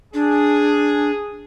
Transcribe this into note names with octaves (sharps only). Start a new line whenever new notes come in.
D4 G#4